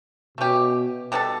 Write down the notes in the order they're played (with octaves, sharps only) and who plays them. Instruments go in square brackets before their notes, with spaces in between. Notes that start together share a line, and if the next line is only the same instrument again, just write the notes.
[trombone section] B2 [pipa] A3 C#4 G4
[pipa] B2 G3 D4 A4